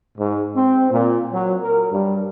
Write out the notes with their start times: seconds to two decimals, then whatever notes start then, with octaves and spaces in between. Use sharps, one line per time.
0.17 G#2
0.55 C4
0.90 A#2
1.32 F#3
1.61 A#4
1.90 G2